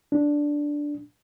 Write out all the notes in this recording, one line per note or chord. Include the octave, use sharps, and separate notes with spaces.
D4